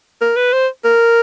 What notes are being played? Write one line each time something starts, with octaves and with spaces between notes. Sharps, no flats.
A#4
B4
C5
A#4